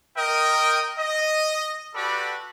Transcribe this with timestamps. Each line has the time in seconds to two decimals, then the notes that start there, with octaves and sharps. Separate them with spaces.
0.17 A#4 D#5 G5
0.99 D#5
1.95 F#4 G4 A4 B4 D5 B5